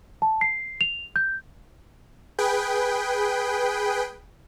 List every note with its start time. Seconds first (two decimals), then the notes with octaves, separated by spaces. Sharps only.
0.22 A5
0.41 C7
0.81 F7
1.16 G6
2.39 G#4 B4 G5